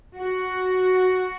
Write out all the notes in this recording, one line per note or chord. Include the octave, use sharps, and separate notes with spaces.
F#4